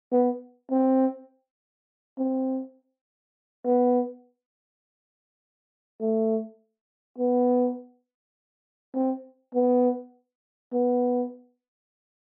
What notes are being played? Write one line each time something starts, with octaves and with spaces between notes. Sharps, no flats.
B3
C4
C4
B3
A3
B3
C4
B3
B3